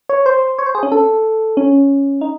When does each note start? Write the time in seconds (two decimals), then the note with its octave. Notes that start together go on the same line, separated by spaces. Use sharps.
0.09 C#5
0.26 C5
0.59 C#5
0.66 C5
0.75 G#4
0.83 C#4
0.92 A4
1.57 C#4
2.21 D#4